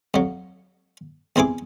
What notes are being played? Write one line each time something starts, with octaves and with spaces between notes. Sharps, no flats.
F2 F#3
E2 C4 E4 G#4 D6